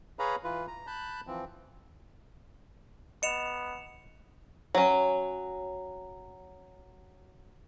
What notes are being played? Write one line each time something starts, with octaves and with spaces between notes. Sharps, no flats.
G#4 B4 C#5 F5 A#5 B5
E3 F4 B4
A#5
A5 B5 F#6 G6
E3 F3 C4
B3 D#5 C#7 E7 F7
F#3 C#4